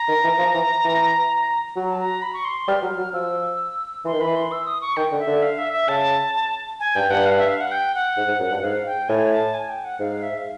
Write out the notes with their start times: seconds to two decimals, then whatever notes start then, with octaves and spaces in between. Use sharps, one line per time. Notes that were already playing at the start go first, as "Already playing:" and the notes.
Already playing: A#5
0.08 D#3
0.24 E3
0.39 F3
0.54 E3
0.85 E3
1.76 F#3 A#5
1.91 A5
1.99 A#5
2.22 B5
2.34 C#6
2.45 C6
2.68 G3 F6
2.83 F#3
2.98 F#3
3.13 F3 E6
4.05 E3 C6
4.13 D#3
4.20 E3 B5
4.36 C6
4.52 E6
4.67 D#6
4.82 C#6
4.97 D#3 G5
5.12 D3
5.19 E5
5.27 D3
5.42 F5
5.58 E5
5.73 E5
5.88 C#3 A5
6.80 G#5
6.95 G2 G5
7.10 G2 F#5
7.26 F5
7.38 E5
7.49 F5
7.60 F#5
7.72 G5
7.95 F#5
8.17 G#2
8.28 G#2
8.40 F#2
8.51 G2
8.62 G#2 F5
8.86 G5
9.09 A2 G#5
9.32 A5
9.54 G#5
9.70 G5
9.85 F#5
10.00 G#2 F5
10.23 E5
10.37 F5